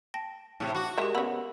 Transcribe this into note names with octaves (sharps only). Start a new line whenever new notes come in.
G5 A5 A#6
A2 C3
F#4 D6 F#6
G#3 G4 A#4 E5
C#3 B3 B5 E6